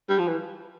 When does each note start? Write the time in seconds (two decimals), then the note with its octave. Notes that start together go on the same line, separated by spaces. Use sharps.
0.10 G3
0.19 F3
0.28 E3